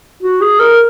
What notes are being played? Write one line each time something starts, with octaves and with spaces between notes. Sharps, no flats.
F#4
G#4
A#4